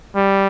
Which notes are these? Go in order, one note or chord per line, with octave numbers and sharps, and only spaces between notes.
G3